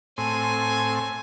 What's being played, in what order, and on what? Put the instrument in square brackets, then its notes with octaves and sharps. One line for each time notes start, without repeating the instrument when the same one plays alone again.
[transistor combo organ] A2 C4 [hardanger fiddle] G#5